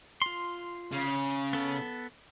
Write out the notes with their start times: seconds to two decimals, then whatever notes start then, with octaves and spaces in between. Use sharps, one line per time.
0.22 F4 C6
0.92 C#3
1.53 B3 A4